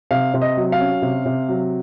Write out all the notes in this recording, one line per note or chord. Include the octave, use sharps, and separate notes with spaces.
C3 F5
C3
D#5
F#3
F5
C#4
C3
C3
F#3